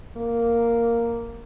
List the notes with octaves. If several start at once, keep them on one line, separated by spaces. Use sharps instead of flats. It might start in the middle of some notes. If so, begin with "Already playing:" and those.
A#3